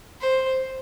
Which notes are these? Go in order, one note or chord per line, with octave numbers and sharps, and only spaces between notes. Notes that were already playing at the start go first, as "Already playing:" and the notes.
C5